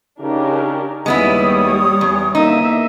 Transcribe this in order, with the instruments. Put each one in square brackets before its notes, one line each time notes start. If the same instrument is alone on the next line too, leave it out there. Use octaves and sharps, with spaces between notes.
[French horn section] C#3 D#4 [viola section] D4 G4 A#4
[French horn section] D#2 [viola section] G3 C#5 [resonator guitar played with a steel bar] G#3 B3 E4 [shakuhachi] D#6
[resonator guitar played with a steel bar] E2
[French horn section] E2 D3 A#3 [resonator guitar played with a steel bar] D#4 [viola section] E5